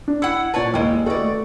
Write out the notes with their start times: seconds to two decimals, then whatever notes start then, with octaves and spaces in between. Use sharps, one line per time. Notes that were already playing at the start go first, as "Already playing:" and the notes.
0.08 D4
0.22 E4 F#5 E6 C#7
0.54 A#2 B4 C#5 D5 A5
0.74 D#2 G3 G#3 E4
1.06 F#4 A4 B4 D5 D#5
1.21 A3